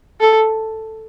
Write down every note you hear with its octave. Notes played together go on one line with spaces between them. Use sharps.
A4